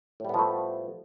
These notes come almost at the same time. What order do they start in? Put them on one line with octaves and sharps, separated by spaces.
A2 G3 B3 F3 A3